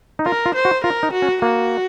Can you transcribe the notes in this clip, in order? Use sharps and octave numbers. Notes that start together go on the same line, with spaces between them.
D#4
F4 A#4
F4
C5
F#4
F4 A#4
D#4
F#4
C#4
A#3 F#4